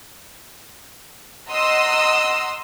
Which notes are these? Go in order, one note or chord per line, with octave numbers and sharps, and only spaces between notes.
D#5 F#5 A#5 C6 D#6 E6